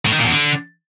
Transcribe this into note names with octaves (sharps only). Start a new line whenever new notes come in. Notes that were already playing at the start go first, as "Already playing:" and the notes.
A2
D#3
A#2
E2
D3